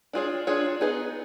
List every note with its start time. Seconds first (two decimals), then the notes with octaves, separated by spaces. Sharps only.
0.13 D4 F4 G#4 C#5
0.47 D4 F4 G#4 C#5
0.81 B3 D#4 G#4 B4 D#5